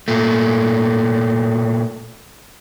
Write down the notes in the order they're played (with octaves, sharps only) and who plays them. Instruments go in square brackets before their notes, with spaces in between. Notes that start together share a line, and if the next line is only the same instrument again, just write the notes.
[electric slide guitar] A#2 A3